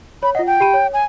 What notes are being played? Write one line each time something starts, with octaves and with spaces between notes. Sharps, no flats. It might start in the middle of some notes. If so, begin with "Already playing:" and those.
C#5 B5
F4 D#5 F#5
G5
G4 B5 D#7
C#5
G#5